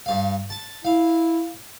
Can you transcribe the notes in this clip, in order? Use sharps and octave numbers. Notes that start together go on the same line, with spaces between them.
G2 F5
A5
E4 F5